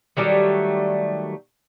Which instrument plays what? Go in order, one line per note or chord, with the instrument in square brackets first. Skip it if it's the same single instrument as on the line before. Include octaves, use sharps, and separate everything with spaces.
[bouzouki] D#3 F#3 G3 A3